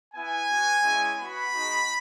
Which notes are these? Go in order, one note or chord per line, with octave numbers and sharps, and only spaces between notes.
B3 E4 G#5
B3 F#4
G#3 C#4 E4
B3 F#4 B5
G#3 D#4 F#4